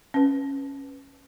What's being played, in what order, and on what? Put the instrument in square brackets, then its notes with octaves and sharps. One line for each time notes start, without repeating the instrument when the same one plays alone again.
[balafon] C#4 B4